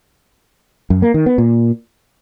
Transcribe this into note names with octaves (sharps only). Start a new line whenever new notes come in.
F#2
A#3
D#3
B3
A#2